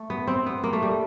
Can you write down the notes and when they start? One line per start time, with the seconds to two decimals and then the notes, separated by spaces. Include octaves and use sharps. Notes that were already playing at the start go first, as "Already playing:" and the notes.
Already playing: A3
0.10 B3
0.27 C4
0.46 B3
0.64 A#3
0.73 A3
0.82 G3